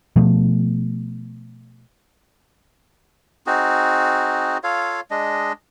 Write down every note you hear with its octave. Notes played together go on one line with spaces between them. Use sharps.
B2 F3 A3
C4 D#4 F#4 G#4
F4 A4 C#5 F5
G#3 D4 D#5